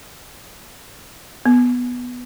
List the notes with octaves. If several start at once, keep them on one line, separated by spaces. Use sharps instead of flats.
B3